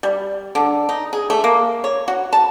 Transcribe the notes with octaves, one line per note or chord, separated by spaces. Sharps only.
G3
D3
D#4
G#4
A3
A#3
C#5
F#4
A5